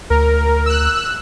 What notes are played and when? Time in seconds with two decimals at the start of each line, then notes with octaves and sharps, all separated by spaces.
0.10 D2 A#4
0.66 E6 F#6